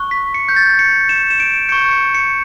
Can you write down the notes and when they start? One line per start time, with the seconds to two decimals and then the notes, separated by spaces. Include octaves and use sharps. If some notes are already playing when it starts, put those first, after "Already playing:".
Already playing: C#6 F#6
0.11 B6
0.34 C#7
0.49 G6
0.56 A6
0.79 C#7
1.09 E7
1.30 E7
1.40 D7
1.69 C#6 G6 C#7
1.91 C#7
2.15 C#7